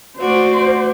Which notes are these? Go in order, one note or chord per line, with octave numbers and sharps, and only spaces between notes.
A3 F#4 C5 D5